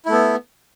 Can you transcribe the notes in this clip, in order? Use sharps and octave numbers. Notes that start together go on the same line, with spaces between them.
A3 B3 E4